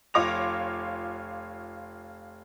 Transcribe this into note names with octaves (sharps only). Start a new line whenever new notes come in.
F1 F4 C#5 D6 A#6 F7